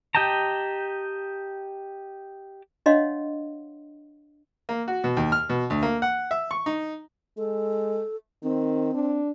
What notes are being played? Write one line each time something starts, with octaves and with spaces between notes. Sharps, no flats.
G4 D#5 G5 A5 A#5
D4 C#5 D#5 F5 F#5 C6
A#3
F#4
B2
D#2
F6
B2
D2
A#3
F#5
E5
C#6
D#4
G#3 A4
D#3 C4
D4